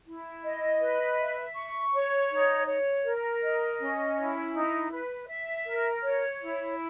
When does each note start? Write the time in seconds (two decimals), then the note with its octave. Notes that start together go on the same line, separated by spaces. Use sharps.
0.06 E4
0.44 D#5
0.80 B4
1.18 E5
1.55 C#6
1.93 C#5
2.30 D#4
2.67 C#5
3.04 A#4
3.42 D#5
3.79 C#4
4.17 E4
4.54 D#4
4.91 B4
5.28 E5
5.66 A#4
6.03 C#5
6.40 E4